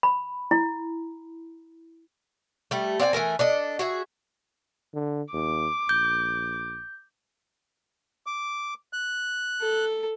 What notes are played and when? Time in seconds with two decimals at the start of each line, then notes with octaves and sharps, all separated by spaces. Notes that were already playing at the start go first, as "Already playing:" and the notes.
0.03 B5
0.51 E4
2.71 G3 A3
2.99 C4 D5 F5 G#5
3.13 E3 A3 A#4 G#5
3.39 D4 A4 D#5
3.79 F#4 G#4 E5
4.94 D3
5.33 D#2 D6
5.89 A#1 G6
8.27 D6
8.93 F#6
9.61 A4